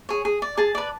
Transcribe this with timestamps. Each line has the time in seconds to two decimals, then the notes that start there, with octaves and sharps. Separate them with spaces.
0.09 G#4 C#5
0.25 G#4
0.42 D5
0.58 G#4 A5
0.75 B4 D5